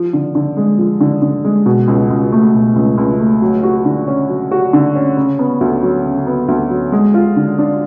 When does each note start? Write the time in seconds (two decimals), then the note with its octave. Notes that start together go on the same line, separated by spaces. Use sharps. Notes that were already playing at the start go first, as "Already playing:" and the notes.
Already playing: F3
0.13 D3
0.35 D3
0.57 G#3
0.78 F3
1.01 D3
1.22 D3
1.45 G#3
1.66 B2
1.88 C#2
2.10 C#2
2.32 A3
2.54 B2
2.76 C#2
2.98 C#2
3.20 A3
3.42 F#3
3.63 F#4
3.85 D3
4.07 C#4
4.29 F#3
4.51 F#4
4.73 D3
4.95 C#4
5.17 C#3
5.39 B3
5.61 D2
5.83 F#3
6.04 C#3
6.27 B3
6.48 D2
6.71 F#3
6.92 G#3
7.14 F4
7.36 D3
7.59 D4